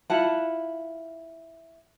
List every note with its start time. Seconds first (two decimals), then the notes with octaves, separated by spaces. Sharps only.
0.10 E4 F4 F#5 A5